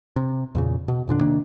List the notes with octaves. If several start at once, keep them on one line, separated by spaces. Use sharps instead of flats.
C3
E2 A#2 C#3
B2
E1 A#2 D3 D4
C3 D#3 A#3 D4